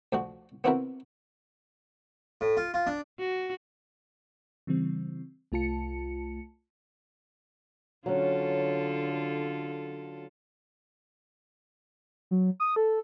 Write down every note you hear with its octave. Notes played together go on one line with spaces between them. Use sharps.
D2 F3 F#4
B3 C4 E4 F#4 A#4 B4
A2
F4
F4
D4
F#4
C#3 E3 G3 C4
C2 A3 F4 A5 C#7
D3 F#3 C#4 F4 A4
F#3
D#6
A4